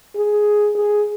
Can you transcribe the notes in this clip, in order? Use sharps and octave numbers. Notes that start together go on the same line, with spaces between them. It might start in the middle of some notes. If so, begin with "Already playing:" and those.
G#4
G#4